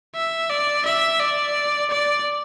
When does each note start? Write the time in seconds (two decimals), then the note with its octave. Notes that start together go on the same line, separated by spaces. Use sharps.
0.15 E5
0.50 D5
0.85 E5
1.20 D5
1.90 D5